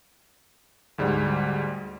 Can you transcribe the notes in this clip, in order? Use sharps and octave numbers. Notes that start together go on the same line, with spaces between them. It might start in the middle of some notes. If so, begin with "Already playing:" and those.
D2 G#2 G3